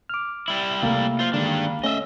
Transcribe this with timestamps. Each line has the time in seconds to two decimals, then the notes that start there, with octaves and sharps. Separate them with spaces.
0.09 D6 F6
0.48 G3 E4
0.83 C3 A3 A#3
1.19 F4 C5
1.34 D3 D#3 G3 G#3 D4
1.84 A3 C#4 D#5 E5